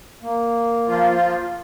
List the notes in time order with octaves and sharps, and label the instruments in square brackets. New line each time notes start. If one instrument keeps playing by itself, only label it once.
[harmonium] A#3
[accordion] F3 F4